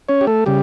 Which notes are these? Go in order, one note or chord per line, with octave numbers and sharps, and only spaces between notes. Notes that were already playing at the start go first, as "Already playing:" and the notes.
C#4 C#5
G4
A3 A4
C#3 G3 G4